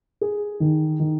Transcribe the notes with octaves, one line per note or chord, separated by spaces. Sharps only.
G#4
D#3
D#3